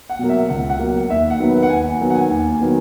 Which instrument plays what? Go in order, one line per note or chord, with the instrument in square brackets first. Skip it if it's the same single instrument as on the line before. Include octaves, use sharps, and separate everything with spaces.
[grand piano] F#5
B2 F#3 A#3
E5
C#2 F#5
F#5
B2 F#3 A#3
F#5
D#2 E5
F#5
D#3 F#3 B3
B4
F#5
D#2 G#5
G#5
D#3 F#3 B3
F#5
G#5
D#2 G#5
G#5
D#3 F#3 B3